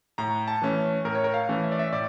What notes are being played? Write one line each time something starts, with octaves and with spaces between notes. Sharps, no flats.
A2 A#5
A5
E3 A3 C#4
A2 A#4
C#5
A#4
F5
E3 A3 C#4
E5
D5
E5
A2 D5